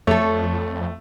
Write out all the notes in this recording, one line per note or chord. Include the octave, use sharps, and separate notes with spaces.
F2 A3 A4 C#5